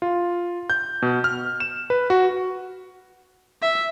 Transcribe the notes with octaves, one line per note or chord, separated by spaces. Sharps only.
F4
G6
B2
F6
E7
B4
F#4
E5